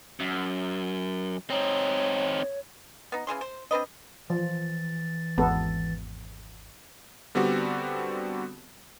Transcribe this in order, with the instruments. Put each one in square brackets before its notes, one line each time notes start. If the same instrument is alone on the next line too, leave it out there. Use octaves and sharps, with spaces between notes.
[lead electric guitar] F#2
[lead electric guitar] C4 D#4 [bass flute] C#5
[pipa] B3 D#4
C#3 E3 G#4 C6
C5
C4 D4 B4 D#5
[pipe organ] E3 A6 [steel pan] F3
[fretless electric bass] G#1 E2 [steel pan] B3 A4
[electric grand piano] D3 G3 B3 C4 F#4 G4